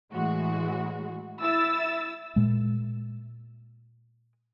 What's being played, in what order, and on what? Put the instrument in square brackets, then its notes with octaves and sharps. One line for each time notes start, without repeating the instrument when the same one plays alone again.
[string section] A2 E3 G#3 F#4
E4 E6 A6
[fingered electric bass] A#2 G#3